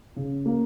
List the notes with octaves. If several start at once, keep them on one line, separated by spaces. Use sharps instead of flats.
C#3
A#3